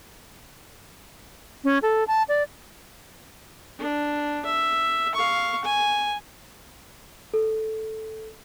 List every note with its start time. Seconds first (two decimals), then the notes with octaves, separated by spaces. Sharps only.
1.64 C#4
1.82 A4
2.08 A5
2.29 D5
3.79 D4
4.46 E5
5.15 F5 C#6
5.65 G#5
7.34 A4